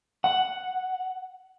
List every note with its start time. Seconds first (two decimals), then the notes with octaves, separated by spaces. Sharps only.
0.24 F#5